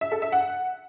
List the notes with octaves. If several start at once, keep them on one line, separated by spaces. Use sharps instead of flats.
E5
A4
E5
F#5